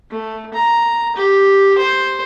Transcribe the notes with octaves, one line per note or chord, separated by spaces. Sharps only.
A3
A#5
G4
C5